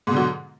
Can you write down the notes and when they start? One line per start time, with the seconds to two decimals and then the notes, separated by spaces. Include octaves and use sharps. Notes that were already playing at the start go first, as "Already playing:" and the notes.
0.07 G#2
0.10 B2
0.13 D3
0.16 F#3